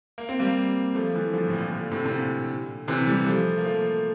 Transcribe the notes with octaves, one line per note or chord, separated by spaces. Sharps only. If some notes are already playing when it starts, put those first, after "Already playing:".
A#3
C4
G3 A#3
F3 A3
E3 G3
D3 F3
A2
A#2
A#2 D3
A2 C3
C3
A#2 D3
C3 E3
E3 G3
F3 A3
A#3
F3 A3